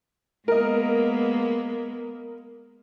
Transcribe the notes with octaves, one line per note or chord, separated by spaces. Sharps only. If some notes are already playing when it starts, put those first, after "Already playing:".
G#3 A#3 B3 A#4 D#5